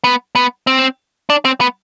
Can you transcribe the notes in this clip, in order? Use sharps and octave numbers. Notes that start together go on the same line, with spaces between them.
B3
B3
C4
D4
C4
B3